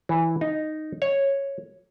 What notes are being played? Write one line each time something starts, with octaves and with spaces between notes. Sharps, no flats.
E3
D#4
C#5